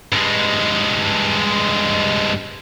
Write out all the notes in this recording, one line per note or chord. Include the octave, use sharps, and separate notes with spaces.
G2 G#3